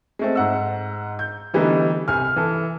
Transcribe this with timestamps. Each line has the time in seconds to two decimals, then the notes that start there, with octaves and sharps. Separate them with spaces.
0.19 G#3 A3 C4
0.35 G#2 F#5 E6
1.19 G6
1.54 D3 E3 G3 A3 B3 D#4
2.08 C2 G#5 F6
2.36 E3 A4